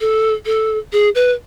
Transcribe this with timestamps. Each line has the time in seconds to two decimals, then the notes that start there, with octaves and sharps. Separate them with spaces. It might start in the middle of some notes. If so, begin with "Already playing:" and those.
0.01 A4
0.46 A4
0.93 G#4
1.15 B4